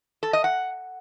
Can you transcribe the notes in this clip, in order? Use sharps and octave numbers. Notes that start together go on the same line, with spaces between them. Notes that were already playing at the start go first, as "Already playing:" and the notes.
A4
D#5
F#5